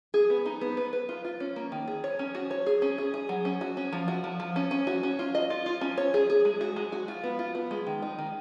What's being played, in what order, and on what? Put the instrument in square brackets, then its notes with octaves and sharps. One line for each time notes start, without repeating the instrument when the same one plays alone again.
[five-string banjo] G#4
B3
D#4
B3
B4
B4
F4
F4
C#4
A#3
D#3
G#4
C#5
C#4
F#4
C#5
G#4
C#4
G#4
G#4
F#3
C#4
F#4
C#4
F3
F#4
F3
F3
C#4
C#4
F#4
C#4
F4
D#5
F4
F4
C#4
C#5
G#4
G#4
G#3
F#4
G#3
F#4
F4
B3
F4
B3
G#3
D#3
D#4
D#3